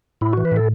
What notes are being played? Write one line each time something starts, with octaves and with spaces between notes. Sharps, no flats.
A2 E4
E3 F#4
B4
A2 A4